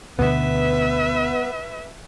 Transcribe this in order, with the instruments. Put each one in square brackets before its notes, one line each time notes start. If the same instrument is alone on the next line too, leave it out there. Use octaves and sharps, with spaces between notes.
[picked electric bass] D2 B2 D3 [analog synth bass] B3 [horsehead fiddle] B4 E5